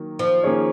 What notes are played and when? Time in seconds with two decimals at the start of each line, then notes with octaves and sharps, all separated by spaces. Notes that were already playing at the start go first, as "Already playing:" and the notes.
Already playing: D#3 F#3 A#3
0.19 F3
0.44 D#3 A#3 C#4 G#4 C#5